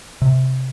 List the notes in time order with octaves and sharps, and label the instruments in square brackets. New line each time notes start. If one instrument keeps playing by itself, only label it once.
[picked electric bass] C3